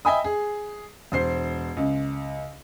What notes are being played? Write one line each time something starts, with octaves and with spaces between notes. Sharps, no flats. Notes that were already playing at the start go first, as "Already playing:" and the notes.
D#5 E5 G5 G#5 B5 D#6
G#4
E1 C5 C7
C#2